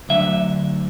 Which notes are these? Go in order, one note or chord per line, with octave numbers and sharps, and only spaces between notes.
D2 D3 F#3 E5